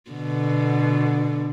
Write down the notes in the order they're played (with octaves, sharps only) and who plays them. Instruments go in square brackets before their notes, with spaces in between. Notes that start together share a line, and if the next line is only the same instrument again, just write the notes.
[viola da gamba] B2 D3